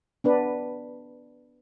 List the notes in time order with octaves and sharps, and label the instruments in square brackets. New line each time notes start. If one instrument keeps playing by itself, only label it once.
[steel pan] B3 D4 B4